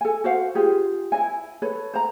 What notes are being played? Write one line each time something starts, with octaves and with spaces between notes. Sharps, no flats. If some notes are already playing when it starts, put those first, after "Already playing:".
A4 G#5
F#4 C5 F5 F#5
F4 G4 G#4
E4 D#5 G#5
A4 B4 C#5
C5 A#5